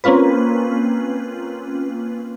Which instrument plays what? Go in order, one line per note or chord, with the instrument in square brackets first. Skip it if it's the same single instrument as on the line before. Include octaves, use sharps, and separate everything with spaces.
[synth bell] A#3 C4 C#4 F4 B4